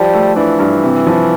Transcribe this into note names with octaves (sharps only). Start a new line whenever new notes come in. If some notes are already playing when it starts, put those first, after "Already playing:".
Already playing: F3 G3
A3
E3 D4
G2
C3
F3